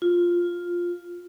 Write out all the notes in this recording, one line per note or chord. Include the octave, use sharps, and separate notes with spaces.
F4